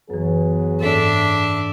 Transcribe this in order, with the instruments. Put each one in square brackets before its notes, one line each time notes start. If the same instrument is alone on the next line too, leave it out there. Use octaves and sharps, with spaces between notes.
[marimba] F#2 E3 [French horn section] F#3 B3 G#4
[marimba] G#2 A4 A6 [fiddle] D4 E5